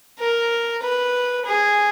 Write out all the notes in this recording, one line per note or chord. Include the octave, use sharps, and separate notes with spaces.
A#4
B4
G#4